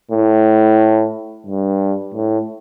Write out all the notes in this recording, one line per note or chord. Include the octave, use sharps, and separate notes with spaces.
A2
G2
A2